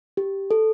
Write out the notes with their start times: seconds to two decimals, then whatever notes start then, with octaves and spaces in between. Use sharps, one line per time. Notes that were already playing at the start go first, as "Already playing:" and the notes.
0.17 G4
0.51 A4